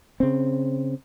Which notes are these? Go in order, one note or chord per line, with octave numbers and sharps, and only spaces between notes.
C#3 C4